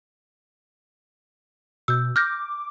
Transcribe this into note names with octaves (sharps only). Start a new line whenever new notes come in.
B2 E6 G6
D6 F6 G6 A#6